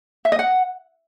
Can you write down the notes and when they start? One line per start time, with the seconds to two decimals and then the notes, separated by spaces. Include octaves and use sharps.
0.25 E5
0.32 D#5
0.39 F#5